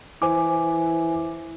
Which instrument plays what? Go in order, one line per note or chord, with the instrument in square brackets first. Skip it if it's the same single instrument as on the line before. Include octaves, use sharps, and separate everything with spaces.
[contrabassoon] E3 [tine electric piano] C5 G#5 D6